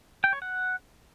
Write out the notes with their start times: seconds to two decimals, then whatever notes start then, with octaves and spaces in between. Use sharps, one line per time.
0.24 G5
0.33 C#5
0.42 F#5